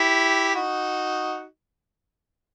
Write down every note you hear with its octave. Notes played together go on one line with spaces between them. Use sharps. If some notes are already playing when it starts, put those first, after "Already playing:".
Already playing: E4 G4
D#4 F#4